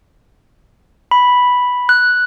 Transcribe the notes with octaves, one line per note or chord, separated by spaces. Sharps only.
B5
F#6